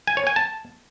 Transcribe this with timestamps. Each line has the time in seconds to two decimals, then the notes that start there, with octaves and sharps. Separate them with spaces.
0.07 G#5
0.17 C#5
0.27 G#5
0.36 A5